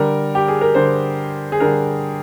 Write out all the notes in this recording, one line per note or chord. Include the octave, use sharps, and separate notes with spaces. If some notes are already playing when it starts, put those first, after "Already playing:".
Already playing: D3 G3 A#4
G4
G#4
A#4
D3 G3 C5
G#4
D3 G3 A#4